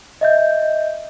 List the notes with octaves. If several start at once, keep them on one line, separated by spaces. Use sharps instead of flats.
D#5 E5 G6